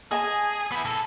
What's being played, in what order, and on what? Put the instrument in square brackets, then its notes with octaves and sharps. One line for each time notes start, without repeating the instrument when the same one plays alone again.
[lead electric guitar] G#4 [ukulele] D#5 G#5 A5
[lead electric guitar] B3 E4
B2 A4